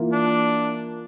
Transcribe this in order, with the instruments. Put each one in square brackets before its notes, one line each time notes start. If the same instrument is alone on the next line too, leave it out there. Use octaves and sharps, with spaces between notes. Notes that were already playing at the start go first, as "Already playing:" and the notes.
Already playing: [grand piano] E3 A#3 F4
[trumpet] D4